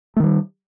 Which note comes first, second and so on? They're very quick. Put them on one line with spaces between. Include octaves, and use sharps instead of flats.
A3 D#3 G3